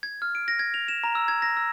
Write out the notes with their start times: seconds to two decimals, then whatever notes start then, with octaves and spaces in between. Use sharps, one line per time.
0.03 G#6
0.22 F6
0.35 D7
0.48 A#6
0.59 G#6
0.74 F7
0.88 E7
1.04 A#5
1.15 E6
1.28 G#6
1.42 A#6
1.57 E6